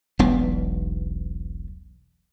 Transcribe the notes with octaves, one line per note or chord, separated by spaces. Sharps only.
E1 B1 B3